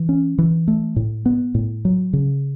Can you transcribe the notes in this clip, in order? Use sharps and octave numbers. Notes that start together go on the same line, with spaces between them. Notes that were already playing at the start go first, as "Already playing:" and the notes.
Already playing: E3
C#4
E3
A3
A2
B3
A2
F#3
C#3